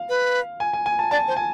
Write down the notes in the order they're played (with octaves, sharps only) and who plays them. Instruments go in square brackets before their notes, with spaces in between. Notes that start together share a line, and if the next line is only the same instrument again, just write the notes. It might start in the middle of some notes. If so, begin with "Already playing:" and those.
Already playing: [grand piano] F5
[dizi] B4
[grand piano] G#5
G#5
G#5
A5
[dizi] D5 [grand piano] A5
[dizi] C5
[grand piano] G#5